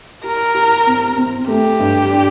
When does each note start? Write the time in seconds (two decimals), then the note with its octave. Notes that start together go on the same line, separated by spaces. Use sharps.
0.24 G4 A#4
0.55 G4
0.87 C4
1.17 C4
1.48 A3 G4
1.79 G2
2.10 D4